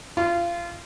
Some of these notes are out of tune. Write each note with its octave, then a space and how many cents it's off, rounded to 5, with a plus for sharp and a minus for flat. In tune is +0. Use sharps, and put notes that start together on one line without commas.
F4 -25